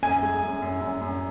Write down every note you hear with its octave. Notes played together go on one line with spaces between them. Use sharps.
F#2 G#5
G#3
F#2
F#2
F#2
F#2